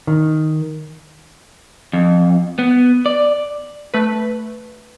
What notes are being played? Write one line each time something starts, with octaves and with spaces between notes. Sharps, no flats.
D#3
F2
B3
D5
A3 B4